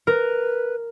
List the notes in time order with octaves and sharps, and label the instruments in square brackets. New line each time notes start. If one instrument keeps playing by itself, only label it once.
[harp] A#4 [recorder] B4